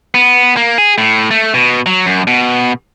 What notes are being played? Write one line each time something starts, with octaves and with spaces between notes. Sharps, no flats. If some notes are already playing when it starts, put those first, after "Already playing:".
B3
A#3
G#4
A2
A3
B2
F#3
F#2
B2